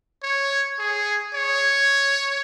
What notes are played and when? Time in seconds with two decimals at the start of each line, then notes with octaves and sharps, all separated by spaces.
0.23 C#5
0.79 G#4
1.34 C#5